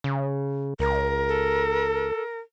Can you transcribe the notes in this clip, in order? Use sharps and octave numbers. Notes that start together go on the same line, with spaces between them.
C#3
C#2 A#4
A4